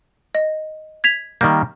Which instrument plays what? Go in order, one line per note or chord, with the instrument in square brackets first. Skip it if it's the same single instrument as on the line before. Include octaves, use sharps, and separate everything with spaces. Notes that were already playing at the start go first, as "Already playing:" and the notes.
[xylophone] D#5
G#6 B6 F7
[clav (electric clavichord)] D#3 G3 A#3 [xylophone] G6